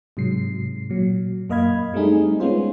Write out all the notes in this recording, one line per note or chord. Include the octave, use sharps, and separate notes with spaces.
G#2 C3 F#3 G#3 C7
A#2 F#3
F#2 A#3 D#5 F5 B5 G#6
G3 A3 C4 D4 D#4 G#4
G#3 B3 C#4 F4 C5